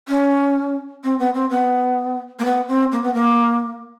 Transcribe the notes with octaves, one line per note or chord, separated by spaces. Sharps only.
C#4
C4
B3
C4
B3
A#3
B3
C4
A#3
B3
A#3